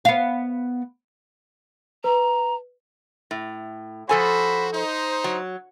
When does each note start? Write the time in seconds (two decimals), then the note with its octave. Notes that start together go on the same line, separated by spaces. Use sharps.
0.05 B3 F5
2.04 B4 A#5
3.31 A2
4.09 F3 F#4 A4 C5 G#5 B5
4.73 D#4 C5
5.24 F#3